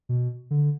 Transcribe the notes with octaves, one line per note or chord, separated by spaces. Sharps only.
B2
D3